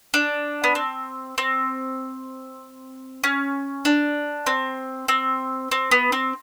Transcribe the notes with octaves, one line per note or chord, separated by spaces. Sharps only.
D4
B3
C4
C4
C#4
D4
C4
C4
C4
B3
C4